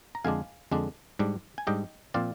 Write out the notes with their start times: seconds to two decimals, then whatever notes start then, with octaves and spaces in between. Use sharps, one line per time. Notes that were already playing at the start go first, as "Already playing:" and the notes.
0.15 A#5
0.24 F2 D3 G#3 D4 F5 G#5
0.71 F2 D3 G#3 D4
1.19 G#2 G3 D4
1.58 G#5
1.67 G#2 G3 D4 D#5 G5
2.14 A#2 F3 C4 D5 F5